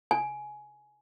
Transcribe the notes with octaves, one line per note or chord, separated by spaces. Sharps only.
G#5